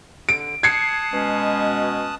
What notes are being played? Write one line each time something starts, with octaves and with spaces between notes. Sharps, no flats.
D3 D7
A5 D#6 F#6 G#6 C7 C#7
B2 G#3 C#4